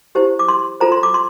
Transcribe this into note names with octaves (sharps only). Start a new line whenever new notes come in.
E4 G4 C5
D6
C6
F4 A4 C5 A#5
C6
D6
C6